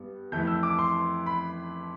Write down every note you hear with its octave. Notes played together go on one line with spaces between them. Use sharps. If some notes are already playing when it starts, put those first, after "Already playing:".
Already playing: G2 G3 B3
F2 E3 A3 G6
E6
D6
C6
B5